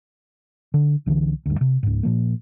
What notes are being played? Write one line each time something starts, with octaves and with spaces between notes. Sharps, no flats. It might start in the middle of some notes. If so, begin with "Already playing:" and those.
D3
C2 D3 E3
D2 G2
C3
C#2 G#2
A#2 F3 A#3